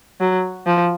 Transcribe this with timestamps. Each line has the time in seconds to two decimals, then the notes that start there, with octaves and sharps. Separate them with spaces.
0.21 F#3
0.67 F3